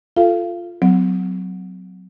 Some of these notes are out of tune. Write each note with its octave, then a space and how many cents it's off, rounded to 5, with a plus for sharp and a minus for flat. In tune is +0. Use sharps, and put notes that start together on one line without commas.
F4 +0 A4 +0 F5 -30
F#3 +0 C4 -40